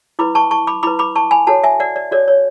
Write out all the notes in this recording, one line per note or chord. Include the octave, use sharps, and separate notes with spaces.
E4 B4 B5 D6
A5 C#6
A5 C#6
B5 D6
E4 B4 B5 D6
B5 D6
A5 C#6
G#5 B5
F#4 A4 C#5 F#5 A5
E5 G#5
D5 F#5
D5
F#4 A4 C#5 D5
C#5